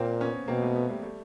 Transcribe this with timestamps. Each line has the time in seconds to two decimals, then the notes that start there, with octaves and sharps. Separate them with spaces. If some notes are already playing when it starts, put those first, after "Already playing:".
Already playing: A#2 A#3 C4
0.20 B3 C#4
0.48 B2 A#3 C4
0.62 A3 B3
0.75 A3 B3
0.89 G3 A3
1.03 G3 A3